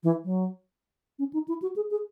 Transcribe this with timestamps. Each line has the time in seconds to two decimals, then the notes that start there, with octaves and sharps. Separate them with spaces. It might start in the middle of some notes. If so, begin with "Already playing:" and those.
0.03 E3
0.24 F#3
1.19 C#4
1.33 D#4
1.48 E4
1.62 F#4
1.76 G#4
1.91 G#4